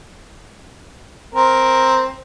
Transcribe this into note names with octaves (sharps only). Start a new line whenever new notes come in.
C4 A#4